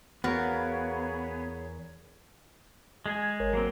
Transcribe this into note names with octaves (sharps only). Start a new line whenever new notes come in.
E2 B3 F#4 G#4 A#4 C#5 F5
G#3 G#4 G#5
G#1 A#4 C#5
F#3 A#3 C4